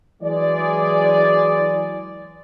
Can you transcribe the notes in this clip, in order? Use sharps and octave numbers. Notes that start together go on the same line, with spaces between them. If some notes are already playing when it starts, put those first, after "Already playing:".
E3 F#3 G#3 G#4 D5